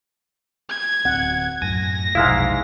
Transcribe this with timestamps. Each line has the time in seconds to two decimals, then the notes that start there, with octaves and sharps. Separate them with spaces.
0.69 G#6
1.05 D1 C4 F#5
1.62 F#2 A2 G#5 A#6
2.15 F1 B1 G#2 G#3 E4 F5